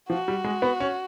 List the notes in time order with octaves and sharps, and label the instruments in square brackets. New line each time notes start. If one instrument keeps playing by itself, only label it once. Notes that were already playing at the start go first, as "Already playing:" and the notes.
[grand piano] F3 [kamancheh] F#4
[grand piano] G3
G#3
B3
C#4